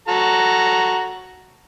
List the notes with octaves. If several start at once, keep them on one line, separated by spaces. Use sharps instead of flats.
F#4 A4 A#5